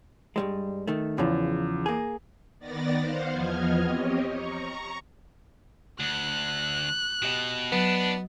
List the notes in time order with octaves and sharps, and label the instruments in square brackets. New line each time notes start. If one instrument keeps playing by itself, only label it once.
[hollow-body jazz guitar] G2 G3 G#3
D#3 A3
[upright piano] E2 [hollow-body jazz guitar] C#3 F3
[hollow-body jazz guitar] A#3 G#4
[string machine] D#3 B3 D5 A6 A#6
C5 F5 F#5
E2 F3 B3 D#5 F6 G#6
C4 G4 C#5 D#5
A#5 C#6
[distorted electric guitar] D2 [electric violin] F#6
[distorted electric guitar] B2 [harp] G4 D#5
[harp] F#3 D#6 [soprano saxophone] B3 [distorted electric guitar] D4